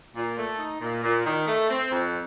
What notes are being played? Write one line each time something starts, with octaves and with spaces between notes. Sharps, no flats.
A#2
A3
D#4
A#2
A#2
D#3
A3
C4
F2